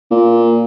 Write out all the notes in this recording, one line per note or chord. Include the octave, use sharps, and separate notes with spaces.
A#2